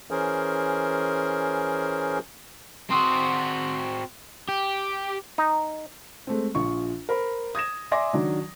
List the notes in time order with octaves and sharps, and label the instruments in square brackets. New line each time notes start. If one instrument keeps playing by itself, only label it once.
[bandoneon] E3 C#4 G#4 A#4 C5
[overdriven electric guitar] C4 F#4 [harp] C6 D#6 E6
[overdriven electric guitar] G4
[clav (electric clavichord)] D#4
[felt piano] G#3 A3 C4
A#1 F4 C#6
A#4 C5 B5
D#6 G#6 A#6 E7
D5 E5 G#5 C6 D6 A#6
D#3 F#3 D4